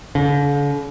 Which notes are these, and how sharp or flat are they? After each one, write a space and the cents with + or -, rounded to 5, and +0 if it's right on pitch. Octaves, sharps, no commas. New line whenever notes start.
D3 -45